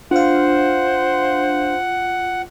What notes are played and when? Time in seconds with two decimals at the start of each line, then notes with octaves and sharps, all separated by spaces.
0.11 D4 F4 C5 F5 F#5